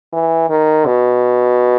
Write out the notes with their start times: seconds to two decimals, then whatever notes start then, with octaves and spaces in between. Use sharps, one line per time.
0.13 E3
0.50 D#3
0.86 B2